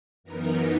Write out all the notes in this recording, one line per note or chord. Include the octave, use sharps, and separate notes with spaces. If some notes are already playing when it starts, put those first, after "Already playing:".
F#2 E3 B3 D#4 A#4